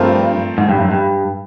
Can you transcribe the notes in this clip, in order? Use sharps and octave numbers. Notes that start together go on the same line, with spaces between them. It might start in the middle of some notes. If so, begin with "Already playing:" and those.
Already playing: G2 F3 A3 C4 F4 A#4
G#2
G2
F#2
G2